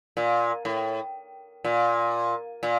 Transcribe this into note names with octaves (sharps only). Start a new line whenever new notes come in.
A#2
A2
A#2
A#2